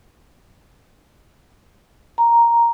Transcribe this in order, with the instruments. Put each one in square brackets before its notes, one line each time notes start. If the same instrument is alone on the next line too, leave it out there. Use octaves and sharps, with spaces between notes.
[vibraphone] A#5